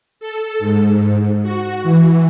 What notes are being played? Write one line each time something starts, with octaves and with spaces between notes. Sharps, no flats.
A4
G#2
F#4
E3